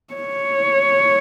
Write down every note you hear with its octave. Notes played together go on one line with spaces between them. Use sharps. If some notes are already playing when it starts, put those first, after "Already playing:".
C#5